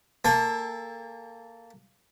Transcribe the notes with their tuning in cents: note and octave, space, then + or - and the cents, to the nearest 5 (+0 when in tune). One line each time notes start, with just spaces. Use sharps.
A#3 -15 A4 +0 G5 +45